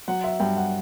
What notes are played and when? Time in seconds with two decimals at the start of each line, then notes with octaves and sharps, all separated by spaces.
0.08 F#3 F#5
0.24 E5
0.40 G2 G5
0.57 F#5